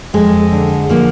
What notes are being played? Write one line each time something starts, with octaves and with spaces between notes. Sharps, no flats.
F2 G#3
D3
F3 A#3